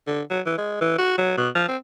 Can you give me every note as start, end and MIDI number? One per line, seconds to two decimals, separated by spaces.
0.07 0.22 50
0.30 0.41 54
0.46 0.56 52
0.57 0.79 56
0.81 0.95 52
0.98 1.17 66
1.18 1.35 54
1.37 1.49 47
1.55 1.66 53
1.68 1.77 60